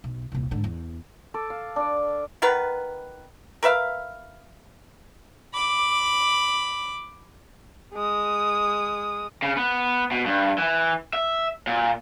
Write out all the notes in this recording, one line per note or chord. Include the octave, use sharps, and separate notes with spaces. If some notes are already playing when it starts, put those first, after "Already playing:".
B1
D#1 C2
G#2 D3
E2
A4 D6
F5
D4 D5
D#3 B3 A#4 B4
A#4 B4 E5 F5
B5 D6
G#3 D#6
C#3
B3
B2
G2
E3
E5
A#2